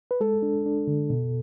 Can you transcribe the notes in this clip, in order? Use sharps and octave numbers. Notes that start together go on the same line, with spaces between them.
B4
G#3 A4
D4
D4
D3
B2